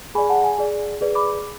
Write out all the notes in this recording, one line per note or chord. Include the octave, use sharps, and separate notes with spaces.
G#4 D5 G#5 B5
F#5 A5
G#5
G#4 D5
G#4 B4 D5
B5 D6